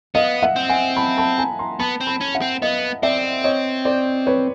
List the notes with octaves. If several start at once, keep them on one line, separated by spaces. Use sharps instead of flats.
B3 D#5 F5
E5 F#5
C4
F#5 G#5
A5 B5
A5 B5
G#5 A#5
A#5 C6
B3 A5 B5
C4
A5 B5
C#4
E5 F#5
C4
B3 D#5 F5
C4 D5 E5
C#5 D#5
C5 D5
B4 C#5